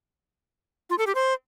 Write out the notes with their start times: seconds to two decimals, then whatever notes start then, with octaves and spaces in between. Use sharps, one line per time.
0.90 F4
0.98 A4
1.07 G4
1.15 C5